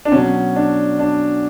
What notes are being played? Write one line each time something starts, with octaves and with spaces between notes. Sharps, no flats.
D4
B2 F#3 C#4
D4
D4